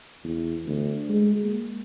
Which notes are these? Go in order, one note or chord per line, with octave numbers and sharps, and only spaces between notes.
E2
D2
G#3
A#3